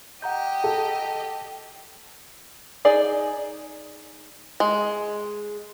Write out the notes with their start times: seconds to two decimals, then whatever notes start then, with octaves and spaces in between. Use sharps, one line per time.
0.22 G4 D#5 F#5 A#5 G6
0.64 A4
2.85 D#4 G#4 D5
4.60 G#3